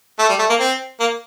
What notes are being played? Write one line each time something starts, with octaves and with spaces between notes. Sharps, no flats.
A3
G3
A3
A#3
C4
A#3